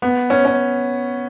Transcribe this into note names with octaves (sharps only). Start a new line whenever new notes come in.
B3
C#4
C#4